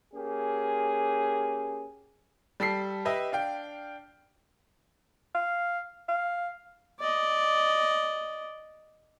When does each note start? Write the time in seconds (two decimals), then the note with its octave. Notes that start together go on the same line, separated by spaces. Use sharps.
0.13 A#3 C#4 G4 G#4
2.60 G3 A4 B6 C7
3.05 G4 B4 D#5 E5
3.32 D4 F5 G5
5.35 F5
6.08 F5
6.99 D5 D#5